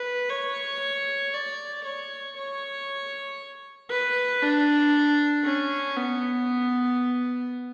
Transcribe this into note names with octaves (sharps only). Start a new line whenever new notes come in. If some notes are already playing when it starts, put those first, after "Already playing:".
Already playing: B4
C#5
D5
C#5
C#5
B4
D4
C#4
B3